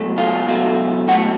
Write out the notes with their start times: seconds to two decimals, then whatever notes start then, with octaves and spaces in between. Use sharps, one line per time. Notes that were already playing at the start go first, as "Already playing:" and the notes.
Already playing: C#2 B2 F#3 A3
0.18 F4 F5
0.48 C#2 B2 F#3 A3
1.08 C#2 B2 F#3 A3 F#4 F#5